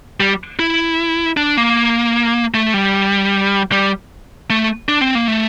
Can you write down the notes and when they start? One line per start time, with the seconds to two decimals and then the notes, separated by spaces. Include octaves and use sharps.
0.20 G3
0.59 E4
1.37 D4
1.57 A#3
2.54 A3
2.74 G3
3.72 G3
4.50 A3
4.89 D4
5.01 C4
5.15 A#3
5.28 A3